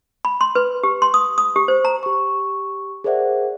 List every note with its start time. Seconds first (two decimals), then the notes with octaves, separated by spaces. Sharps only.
0.25 B5
0.41 C6
0.55 B4
0.83 G4
1.02 C6
1.14 D#6
1.38 D#6
1.56 G4
1.68 C5
1.85 A#5
2.03 G4 C#6
3.04 G#4 A#4 C5 D5 E5 F#5